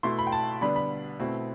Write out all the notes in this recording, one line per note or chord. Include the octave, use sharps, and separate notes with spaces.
B2 A3 E4 C6
B5
G5
A5
D3 G3 B3 D4 B5
B5
B2 A3 C4 E4